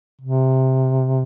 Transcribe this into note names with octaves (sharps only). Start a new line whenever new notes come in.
C3